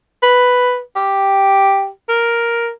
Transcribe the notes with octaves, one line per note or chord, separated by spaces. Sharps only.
B4
G4
A#4